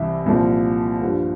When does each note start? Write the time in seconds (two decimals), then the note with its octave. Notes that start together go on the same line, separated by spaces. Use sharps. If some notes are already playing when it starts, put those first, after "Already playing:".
Already playing: C2 C3 E3 E5
0.26 C2 A#2 F3
1.02 G2 F3